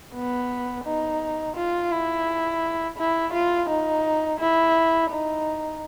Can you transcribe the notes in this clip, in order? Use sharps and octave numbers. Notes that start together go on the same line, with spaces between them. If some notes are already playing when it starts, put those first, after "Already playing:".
B3
D#4
F4
E4
E4
F4
D#4
E4
D#4